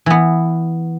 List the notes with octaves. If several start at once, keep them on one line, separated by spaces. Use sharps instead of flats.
E3 B3